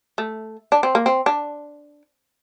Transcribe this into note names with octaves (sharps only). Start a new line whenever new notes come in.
A3
D4
C4
A#3
C4
D4